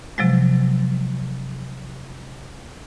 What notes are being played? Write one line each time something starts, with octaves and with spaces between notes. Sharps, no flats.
C3 F3 F#3 G#3